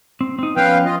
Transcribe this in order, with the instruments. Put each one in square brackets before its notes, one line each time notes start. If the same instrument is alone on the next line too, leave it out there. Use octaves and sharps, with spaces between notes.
[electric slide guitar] C4
C4 D#4
[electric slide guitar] F3 B3 C#4 [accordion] B4 F5 G5
[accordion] F4 D#5